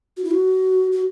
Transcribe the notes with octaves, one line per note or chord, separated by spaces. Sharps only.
F#4
E4
F#4
F#4